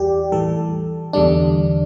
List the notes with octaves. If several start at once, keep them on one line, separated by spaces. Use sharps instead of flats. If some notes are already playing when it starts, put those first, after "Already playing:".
Already playing: E2 E3 G3 G4 D5
A2 E3 G3 A4
E2 D3 G3 D4